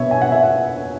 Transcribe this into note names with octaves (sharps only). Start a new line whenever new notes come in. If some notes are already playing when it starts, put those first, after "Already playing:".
Already playing: B2 B3 C#5 E5
G#5
F#5
E5
F#5